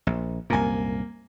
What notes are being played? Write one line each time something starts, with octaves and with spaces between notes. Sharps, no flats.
A#1
C2 F#2 A#2 A#3 G#5